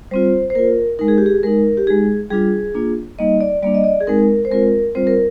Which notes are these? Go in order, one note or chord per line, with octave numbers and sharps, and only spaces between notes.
G3 C4 F4 C5
C5
A#3 F4 A#4
G#3 D#4 A#4
G#4
G4
G#4
G#3 D#4 A#4
G4
G#3 D#4 G#4
G3 D4 F4 G#4
A#3 D4 F4
G3 A#3 D#4 D#5
D5
G3 A#3 D4 D5
D#5
D5
G#4
G#3 C4 D#4 A#4
C5
G#3 C4 F4 A#4
G3 C4 F4 C5
A#4